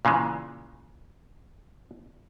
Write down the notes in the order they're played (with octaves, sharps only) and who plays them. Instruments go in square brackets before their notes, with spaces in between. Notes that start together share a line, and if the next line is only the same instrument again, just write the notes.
[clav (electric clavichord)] A#2 C#3 E3 G#3